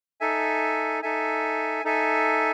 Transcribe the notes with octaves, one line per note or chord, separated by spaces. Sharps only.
D#4 A4 E5 G#5
D#4 A4 E5 G#5
D#4 A4 E5 G#5